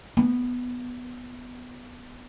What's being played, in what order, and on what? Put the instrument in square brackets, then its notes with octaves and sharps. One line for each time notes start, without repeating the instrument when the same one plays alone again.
[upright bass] B3